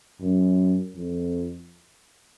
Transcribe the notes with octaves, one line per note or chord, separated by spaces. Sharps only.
F#2
F2